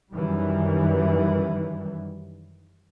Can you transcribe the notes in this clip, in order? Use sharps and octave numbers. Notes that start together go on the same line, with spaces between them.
F#2 D#3 E3 G3